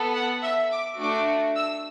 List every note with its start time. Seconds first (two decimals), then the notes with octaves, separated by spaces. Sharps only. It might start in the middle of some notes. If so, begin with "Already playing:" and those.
Already playing: B3 A4
0.14 F#5
0.43 E5
0.71 D6
0.99 A3 D4 F#4 D6
1.56 E6